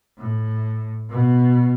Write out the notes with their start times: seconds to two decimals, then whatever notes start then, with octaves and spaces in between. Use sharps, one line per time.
0.18 A2
1.10 B2